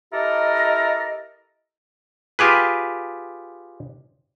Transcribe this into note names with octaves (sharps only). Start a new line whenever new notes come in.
E4 G4 A4 A#4 D#5
F4 G4 G#4 B4